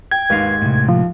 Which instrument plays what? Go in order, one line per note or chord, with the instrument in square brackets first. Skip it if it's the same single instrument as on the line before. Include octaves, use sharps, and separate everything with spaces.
[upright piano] G5 [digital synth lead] G#6
[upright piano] D#2 G#2 [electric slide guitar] B4 F5
[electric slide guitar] A2 C3
[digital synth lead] F3